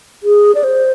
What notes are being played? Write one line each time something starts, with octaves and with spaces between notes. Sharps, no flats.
G#4
D5
C5